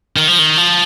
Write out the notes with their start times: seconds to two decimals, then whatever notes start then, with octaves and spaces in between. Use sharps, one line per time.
0.16 D#3
0.28 F3
0.39 D#3
0.58 F3